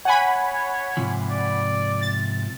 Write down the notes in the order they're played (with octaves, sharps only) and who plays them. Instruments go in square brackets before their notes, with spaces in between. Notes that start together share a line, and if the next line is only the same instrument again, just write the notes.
[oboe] C#5 [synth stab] F#5 G#5 B5
[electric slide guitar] G#2 C3 F3
[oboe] D5
[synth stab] A6